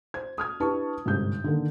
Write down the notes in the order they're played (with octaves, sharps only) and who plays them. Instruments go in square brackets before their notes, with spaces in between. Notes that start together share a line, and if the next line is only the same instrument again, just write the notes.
[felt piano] C5 G#6
D#6 F6 G#6
D4 E4 G4 B4 A5 C#6
G1 G#2 C3 G6
D3 D#3 A#3